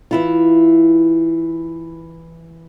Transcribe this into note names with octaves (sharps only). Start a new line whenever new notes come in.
E3 E4 F4